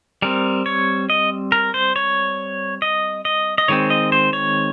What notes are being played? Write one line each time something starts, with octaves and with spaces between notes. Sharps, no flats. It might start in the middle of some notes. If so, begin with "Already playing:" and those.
G3 C4 A#4
C#5
D#5
A#4
C5
C#5
D#5
D#5
D#5
D#3 G#3 C4 C#5
D#5
C5
C#5